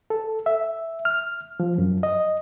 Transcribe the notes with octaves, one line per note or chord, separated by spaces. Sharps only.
A4
E5
F6
F3
F#2
D#5